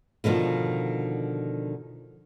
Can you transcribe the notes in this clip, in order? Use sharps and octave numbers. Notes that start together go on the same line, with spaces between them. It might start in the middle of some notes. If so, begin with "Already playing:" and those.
B2 D3 D#3 F3